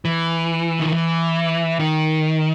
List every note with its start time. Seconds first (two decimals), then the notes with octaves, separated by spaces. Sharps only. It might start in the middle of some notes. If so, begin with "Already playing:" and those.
0.05 E3
0.80 D#3
0.92 E3
1.79 D#3